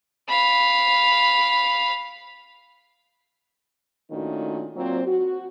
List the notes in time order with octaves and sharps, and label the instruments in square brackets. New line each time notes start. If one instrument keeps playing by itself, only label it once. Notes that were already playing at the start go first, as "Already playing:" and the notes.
[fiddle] F5 B5
[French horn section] A#2 D#3 A3 C#4 D4 F#4
A#2 F#3 C4
F#4